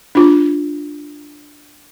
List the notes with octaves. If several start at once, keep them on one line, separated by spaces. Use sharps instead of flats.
D4 F4